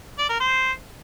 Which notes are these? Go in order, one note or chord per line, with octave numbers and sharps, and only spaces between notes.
D5
A#4
C5